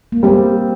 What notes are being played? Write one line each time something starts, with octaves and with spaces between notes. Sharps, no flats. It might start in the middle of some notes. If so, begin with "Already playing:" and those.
A#3
G3 C4